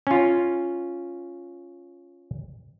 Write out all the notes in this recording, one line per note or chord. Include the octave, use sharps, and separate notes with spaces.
C#4 F4